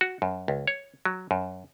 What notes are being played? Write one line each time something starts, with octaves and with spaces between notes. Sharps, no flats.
F#4
F#2
C#2
C#5
F#3
F#2